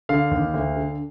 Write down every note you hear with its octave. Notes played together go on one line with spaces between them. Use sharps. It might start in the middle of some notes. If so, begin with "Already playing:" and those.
D3 F5
D#2
D2
D3